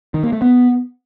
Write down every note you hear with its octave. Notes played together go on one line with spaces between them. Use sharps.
D#3
A#3
A3
B3